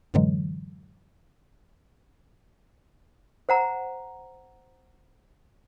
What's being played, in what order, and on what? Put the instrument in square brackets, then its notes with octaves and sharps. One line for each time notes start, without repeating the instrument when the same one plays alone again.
[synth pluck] F#2 A2 D3 E3 F#3 G#3
[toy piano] C5 F#5 A#5